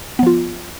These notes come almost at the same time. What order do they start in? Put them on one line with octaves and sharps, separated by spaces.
B3 F3 F4